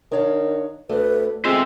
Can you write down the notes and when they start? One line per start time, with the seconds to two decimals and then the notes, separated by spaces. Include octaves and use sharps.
0.12 D#3 D4 C#5 F5
0.89 D2 A3 B4
1.45 G#3 C4 F4 A4 C5 E5